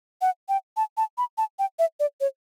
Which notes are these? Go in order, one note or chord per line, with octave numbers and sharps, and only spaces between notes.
F#5
G5
A5
A5
B5
A5
G5
E5
D5
C#5